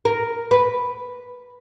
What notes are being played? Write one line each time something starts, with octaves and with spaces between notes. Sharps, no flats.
A#4
B4